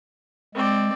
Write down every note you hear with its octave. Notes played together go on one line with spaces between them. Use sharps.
G#3 C4 D5